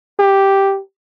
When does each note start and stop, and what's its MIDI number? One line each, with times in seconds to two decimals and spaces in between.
0.19 0.79 67